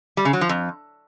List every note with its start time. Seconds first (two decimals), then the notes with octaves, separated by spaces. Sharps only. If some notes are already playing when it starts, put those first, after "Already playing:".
0.17 G3
0.25 C#3
0.33 F#3
0.41 F3
0.49 F2